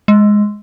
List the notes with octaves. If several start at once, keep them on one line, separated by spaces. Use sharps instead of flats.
G#3